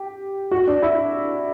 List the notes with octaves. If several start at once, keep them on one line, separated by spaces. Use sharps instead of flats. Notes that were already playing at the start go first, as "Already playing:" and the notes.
Already playing: G4
F#4
D4
E4